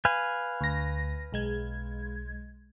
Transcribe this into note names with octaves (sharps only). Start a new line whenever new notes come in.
B4 F5 G#5
D2 A#6
B1 G#3 G#6